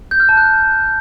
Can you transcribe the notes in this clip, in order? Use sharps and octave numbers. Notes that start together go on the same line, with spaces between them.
G6
F6
A5
F#6